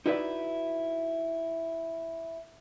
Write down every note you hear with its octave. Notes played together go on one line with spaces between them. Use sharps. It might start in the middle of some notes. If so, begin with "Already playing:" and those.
D#4 E4 F#4 B4 D5 E5